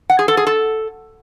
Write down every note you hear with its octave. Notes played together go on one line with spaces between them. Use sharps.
F#5
G#4
A4
G#4
A4